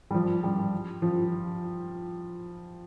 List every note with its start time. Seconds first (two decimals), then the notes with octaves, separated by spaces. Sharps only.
0.11 G3
0.14 F3
0.44 G3
1.02 F3